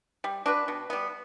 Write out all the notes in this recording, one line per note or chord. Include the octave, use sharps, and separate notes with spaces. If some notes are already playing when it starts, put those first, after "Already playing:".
G3
D4 F#4 B4
B2
G3 B3